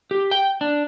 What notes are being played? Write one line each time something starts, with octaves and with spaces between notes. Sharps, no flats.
G4
G5
D4